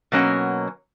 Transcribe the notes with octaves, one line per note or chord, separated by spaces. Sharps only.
B2 F#3 A#3 C#4